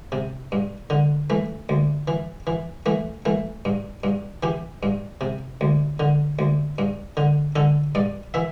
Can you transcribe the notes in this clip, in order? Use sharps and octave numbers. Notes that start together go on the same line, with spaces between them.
C3
G2
D3
E3 A3
D2
E3
E3
E3 A3
E3 A3
G2
G2
E3 G4
G2
C3
D2
D3
D2
G2
D3
D3 A4
G2 D5
E3 E5